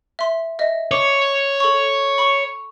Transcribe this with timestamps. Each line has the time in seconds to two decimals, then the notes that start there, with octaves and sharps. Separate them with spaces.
0.19 E5 C6
0.59 D#5 E5
0.91 C#5 D6
1.60 A4 C#6
2.18 B5 C#6